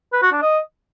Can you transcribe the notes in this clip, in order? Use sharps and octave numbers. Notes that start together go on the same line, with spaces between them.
B4
F#4
D4
D#5